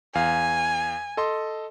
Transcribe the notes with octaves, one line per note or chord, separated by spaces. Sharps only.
E2 F5 G#5
A4 D#5 C6